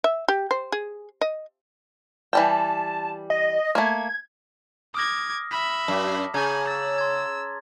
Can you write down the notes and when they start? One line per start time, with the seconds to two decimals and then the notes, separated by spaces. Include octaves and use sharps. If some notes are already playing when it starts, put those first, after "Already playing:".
0.04 E5
0.28 G4
0.51 C5
0.72 G#4
1.21 D#5
2.33 E3 G3 G5 A5
3.30 D#5
3.75 A3 A#3 G#6
4.94 D6 D#6 F6 G#6 A#6
5.51 E5 B5 B6
5.88 F#2 A5 D6
6.34 C#3 G#5 A#5 G#6
6.67 E6 A6
6.98 C6 G#6